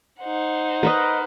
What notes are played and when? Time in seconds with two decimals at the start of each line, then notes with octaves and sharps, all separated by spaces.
0.20 D#4 C5 F#5
0.83 A#4 B4 D#5